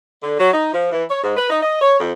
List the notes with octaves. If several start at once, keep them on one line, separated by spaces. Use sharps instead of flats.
D3
F#3
D#4
F3
E3
C#5
G#2
B4
D#4
D#5
C#5
F2